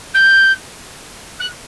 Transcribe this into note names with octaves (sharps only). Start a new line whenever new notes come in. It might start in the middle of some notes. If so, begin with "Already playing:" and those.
G6
F#6